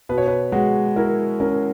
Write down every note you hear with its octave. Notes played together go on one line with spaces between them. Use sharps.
B2 B4
C#5
B4
G#3 F#4
E4 A#4
C#4 A#4